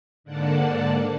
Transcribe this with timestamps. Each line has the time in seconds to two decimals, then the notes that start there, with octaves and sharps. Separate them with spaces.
0.24 G#2 D3 A#3 D5 F#5 A5